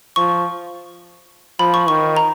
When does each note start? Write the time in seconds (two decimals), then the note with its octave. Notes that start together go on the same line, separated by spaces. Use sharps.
0.16 F3 C#6
1.59 F3 B5
1.74 C#6
1.88 D#3 C#6
2.17 A#5